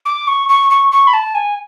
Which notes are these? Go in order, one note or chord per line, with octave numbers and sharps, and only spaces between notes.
D6
C#6
C#6
C#6
C#6
B5
A5
G#5